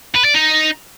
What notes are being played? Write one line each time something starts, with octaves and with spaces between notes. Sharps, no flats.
B4
D5
D#4